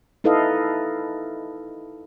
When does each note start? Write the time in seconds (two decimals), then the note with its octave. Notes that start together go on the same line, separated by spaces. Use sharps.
0.24 D#4 E4 A4 B4 D#5 F5